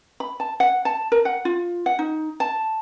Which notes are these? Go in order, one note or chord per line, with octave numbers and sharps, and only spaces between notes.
B5
A5
F#5
A5
A#4
F#5
F4
F#5
D#4
A5